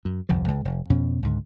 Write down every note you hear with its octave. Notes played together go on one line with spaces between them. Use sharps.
F#2
G1 C2 F2 F3
C#2 G#3
F1
F2 B2 C#4
C#2 G#2 D3